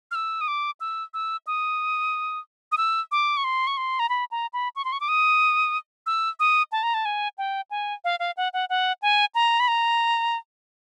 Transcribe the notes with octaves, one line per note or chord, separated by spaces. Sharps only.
F6
E6
D#6
D6
E6
E6
D#6
D#6
E6
D6
C#6
C6
C#6
C6
A#5
B5
A#5
B5
C#6
C6
C#6
D6
D#6
E6
D#6
A5
A#5
A5
G#5
G5
G#5
F5
F5
F#5
F#5
F#5
G#5
A#5
B5
A#5